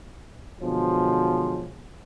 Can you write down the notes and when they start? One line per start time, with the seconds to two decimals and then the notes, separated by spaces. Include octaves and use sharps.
0.61 B2 D3 F3 F#3 G#3 C5